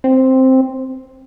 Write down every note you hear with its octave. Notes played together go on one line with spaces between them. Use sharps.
C4